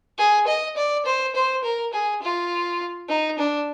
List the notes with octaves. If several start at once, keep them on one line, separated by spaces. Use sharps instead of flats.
G#4
D#5
D5
C5
C5
A#4
G#4
F4
D#4
D4